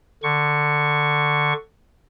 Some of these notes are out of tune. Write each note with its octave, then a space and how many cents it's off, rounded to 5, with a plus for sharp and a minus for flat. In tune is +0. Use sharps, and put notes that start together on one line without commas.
D3 +10 C#6 +0